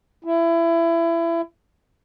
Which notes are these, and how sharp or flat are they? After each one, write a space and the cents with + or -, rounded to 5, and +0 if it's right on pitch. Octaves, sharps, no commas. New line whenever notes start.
E4 +25